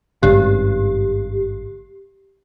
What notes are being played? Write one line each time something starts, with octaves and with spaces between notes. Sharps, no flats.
G#1 G2 C#3 G4